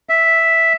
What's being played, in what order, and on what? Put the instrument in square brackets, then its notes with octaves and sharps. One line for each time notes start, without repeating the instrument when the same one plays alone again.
[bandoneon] E5